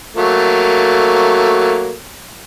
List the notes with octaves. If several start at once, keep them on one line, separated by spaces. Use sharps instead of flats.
F#3 A3 A#3